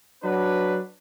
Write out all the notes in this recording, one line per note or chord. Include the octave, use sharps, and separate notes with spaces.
F#3 D4 B4